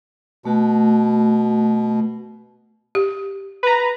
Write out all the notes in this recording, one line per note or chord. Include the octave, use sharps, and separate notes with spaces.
B2 A3 F#4
G4
B4 A#5